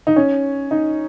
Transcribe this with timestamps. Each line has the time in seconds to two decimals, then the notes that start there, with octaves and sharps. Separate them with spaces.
0.07 D#4
0.16 C#4
0.71 D#4